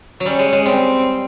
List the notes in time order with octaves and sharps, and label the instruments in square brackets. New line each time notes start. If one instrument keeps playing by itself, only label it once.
[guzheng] F#3
[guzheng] G3 [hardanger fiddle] C#4
[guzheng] G#3
G#3
[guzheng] G3 [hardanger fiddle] C4